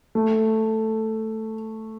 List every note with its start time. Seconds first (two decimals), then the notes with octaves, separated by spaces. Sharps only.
0.15 A3